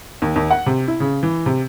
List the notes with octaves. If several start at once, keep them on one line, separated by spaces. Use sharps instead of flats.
D#2
D#2
F#5
C3
E4
C#3
E3
C3